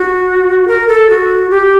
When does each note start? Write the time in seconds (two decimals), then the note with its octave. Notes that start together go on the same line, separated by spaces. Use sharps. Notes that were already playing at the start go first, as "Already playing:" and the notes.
Already playing: F#4
0.68 A#4
0.88 A4
1.09 F#4
1.50 G4